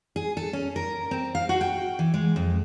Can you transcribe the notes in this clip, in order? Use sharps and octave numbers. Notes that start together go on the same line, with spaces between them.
G#4
A4
C#4
A#4
C4
F5
F#4
G5
E3
G#3
F2